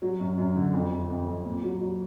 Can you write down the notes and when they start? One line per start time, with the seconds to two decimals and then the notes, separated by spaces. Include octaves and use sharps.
0.02 F#3
0.20 F#2
0.38 F#2
0.56 D3
0.73 F2
0.91 F2
1.10 F2
1.27 F2
1.45 A#2
1.63 F#3
1.81 F#3